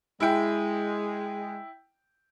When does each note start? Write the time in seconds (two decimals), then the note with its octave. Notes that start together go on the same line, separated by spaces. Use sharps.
0.20 G#3 E4 G5